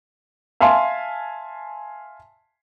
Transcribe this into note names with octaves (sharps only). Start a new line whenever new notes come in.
E5 F5 G#5 A5 C6